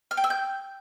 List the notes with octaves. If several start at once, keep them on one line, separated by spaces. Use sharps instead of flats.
F6
G5
E6
G6